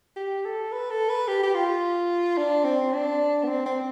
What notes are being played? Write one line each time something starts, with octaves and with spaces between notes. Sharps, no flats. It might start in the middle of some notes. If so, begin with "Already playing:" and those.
G4
A4
B4
A4
B4
G4
G4
F4
D4
C4
D4
B3
C4
C4